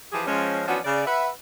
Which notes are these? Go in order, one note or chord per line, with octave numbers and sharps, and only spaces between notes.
E3 F3 G4 G#4
F3 G#3 C#4
E3 F3 B3 C#4 D4 F#4
C#3 D5
B4 E5 F#5